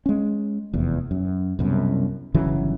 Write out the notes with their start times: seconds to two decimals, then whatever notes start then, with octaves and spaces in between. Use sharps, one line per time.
0.06 G#3 C#4
0.74 F1 E2
1.11 F#2
1.59 C2 F#2 B2
2.34 G1 C#3 E3 F#3